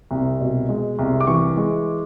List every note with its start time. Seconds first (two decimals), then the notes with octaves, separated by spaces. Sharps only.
0.11 C2
0.41 B2
0.69 G#3
0.99 C2
1.21 D6
1.27 E3 C#6
1.57 G#3